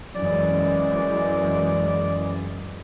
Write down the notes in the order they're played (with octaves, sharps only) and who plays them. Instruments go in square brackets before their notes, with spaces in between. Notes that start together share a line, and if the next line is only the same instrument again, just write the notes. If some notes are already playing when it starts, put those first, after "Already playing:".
[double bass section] F#2 E3 G#3 [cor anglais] D5